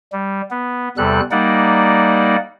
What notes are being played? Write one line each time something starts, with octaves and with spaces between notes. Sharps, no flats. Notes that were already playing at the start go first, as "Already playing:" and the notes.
G3
B3
E2 C3 G3 A4 F#6
G3 A#3 D#4 D5 F#5